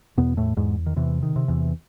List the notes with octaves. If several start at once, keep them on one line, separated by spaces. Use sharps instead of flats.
E2 B2 B3
A2 A3
E2 G#2 G#3
D#3
E2 C3 E3
D#3
C3
E2 E3